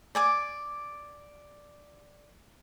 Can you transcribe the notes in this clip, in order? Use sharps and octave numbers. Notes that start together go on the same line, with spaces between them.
D5 G#5 D6